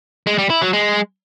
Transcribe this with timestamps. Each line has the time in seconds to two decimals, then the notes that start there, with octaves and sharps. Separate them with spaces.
0.27 G#3
0.38 G3
0.50 E4
0.62 F#3
0.73 G#3